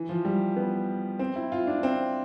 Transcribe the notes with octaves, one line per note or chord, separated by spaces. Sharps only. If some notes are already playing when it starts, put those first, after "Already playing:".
Already playing: E3
F3
G3
B3
C4
E4
F4
D4
C4